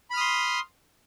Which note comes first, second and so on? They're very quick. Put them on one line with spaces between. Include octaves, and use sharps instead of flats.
B5 F6 D#6 C6